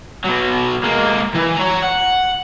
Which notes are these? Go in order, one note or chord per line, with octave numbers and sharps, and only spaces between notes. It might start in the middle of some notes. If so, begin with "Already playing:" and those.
B2 F#3
G#3 A#3
E3
C#5 A#5
F#5